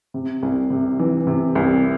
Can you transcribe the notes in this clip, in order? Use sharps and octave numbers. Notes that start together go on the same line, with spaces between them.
C3
C2
C3
E3
C3
C2